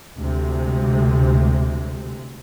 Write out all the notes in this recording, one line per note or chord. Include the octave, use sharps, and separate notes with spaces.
D2 C3 G#3